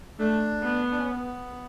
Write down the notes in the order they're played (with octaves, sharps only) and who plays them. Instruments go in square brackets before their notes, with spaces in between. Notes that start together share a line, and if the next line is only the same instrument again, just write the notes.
[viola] A3 [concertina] D4
[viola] B3
[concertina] D4
C#4
B3